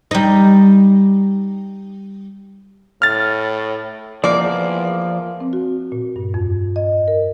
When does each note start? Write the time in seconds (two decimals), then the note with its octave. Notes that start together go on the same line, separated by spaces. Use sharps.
0.11 G3 D#4
3.02 A2 F6 A6
4.24 E2 F3 A#3 D5
5.40 C4
5.53 F#4
5.92 A#2
6.16 G2
6.34 F2
6.76 D#5
7.08 A#4